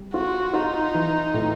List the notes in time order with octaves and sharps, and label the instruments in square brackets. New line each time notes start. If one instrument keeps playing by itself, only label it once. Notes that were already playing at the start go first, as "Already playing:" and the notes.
Already playing: [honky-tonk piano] G3
[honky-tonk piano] F4 [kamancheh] F#4
[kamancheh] D#4 [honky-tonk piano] F4
[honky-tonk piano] E3
A2